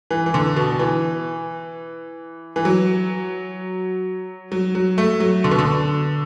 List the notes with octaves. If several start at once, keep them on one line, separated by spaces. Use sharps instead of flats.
E3
E3
D3
B2
E3
E3
F#3
F#3
F#3
A3
F#3
D3
B2
D3